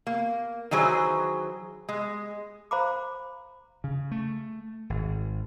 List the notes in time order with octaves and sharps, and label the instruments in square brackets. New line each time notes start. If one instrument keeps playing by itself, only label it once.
[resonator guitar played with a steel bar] A#3
D#3 E3 F#3 G#4 C5
G#3
[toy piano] C5 F5 A#5 B5 D6
[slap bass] C#3
A3
G#1